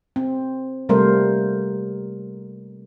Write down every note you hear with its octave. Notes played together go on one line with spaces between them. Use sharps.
C4
C3 G3 A3 A#3 A#4 C5